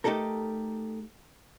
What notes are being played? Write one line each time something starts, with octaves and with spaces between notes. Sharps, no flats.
A3 D#4 G4 A4 A#4